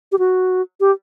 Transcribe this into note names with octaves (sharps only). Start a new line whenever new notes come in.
G4
F#4
G4